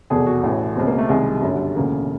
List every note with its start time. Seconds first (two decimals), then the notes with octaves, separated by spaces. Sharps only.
0.10 F1 E2 B2 G#4
0.26 F#4
0.43 A1 A2 E3
0.76 C#2 B2 C4
0.87 A#3
0.98 A3
1.09 C2 C3 D#3 G#3
1.26 G3
1.42 G1 F#2 D3 F#3
1.54 G3
1.75 E1 D2 C#3 E3 A#3